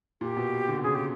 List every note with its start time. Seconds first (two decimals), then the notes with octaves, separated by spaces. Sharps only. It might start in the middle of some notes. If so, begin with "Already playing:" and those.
0.21 A#2 G4
0.37 B2
0.68 D3
0.83 C#3 G#4
0.94 G4